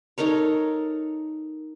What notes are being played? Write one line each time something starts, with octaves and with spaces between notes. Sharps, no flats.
D#4 A4 A#4 C#5